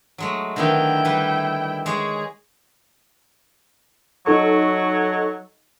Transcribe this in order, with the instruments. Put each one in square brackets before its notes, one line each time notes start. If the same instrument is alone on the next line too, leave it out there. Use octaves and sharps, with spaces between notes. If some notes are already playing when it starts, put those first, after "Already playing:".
[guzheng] F#3 G#3 A3
[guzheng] D3 D#3 B3 [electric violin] E4 G5
[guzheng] G3 B4
[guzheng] G#3 C#5 [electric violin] G#4
[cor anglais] F#3 [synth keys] D#4 A4 C#6